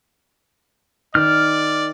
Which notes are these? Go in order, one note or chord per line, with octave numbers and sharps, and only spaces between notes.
D#3 D5 F6